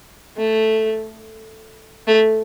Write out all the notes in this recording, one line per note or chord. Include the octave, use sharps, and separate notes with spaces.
A3
A3